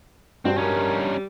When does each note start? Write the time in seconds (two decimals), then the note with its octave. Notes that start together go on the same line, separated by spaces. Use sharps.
0.45 G2 C4 D4 F#4
0.57 G3 C#4 D#4 A#4